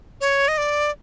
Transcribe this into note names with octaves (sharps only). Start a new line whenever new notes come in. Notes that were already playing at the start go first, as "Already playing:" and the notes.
C#5
D#5
D5